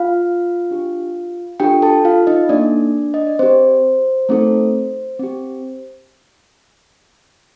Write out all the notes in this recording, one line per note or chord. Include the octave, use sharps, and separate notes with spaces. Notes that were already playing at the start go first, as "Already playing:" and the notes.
Already playing: F4 F5
D4 G4
D4 F4 G4 A4 G5
A4 A5
F4 F5
D#4 D#5
A#3 D4 D#4 A4 D5
D#5
D5
C4 G4 C5
A3 C4 D#4 A4
C4 G4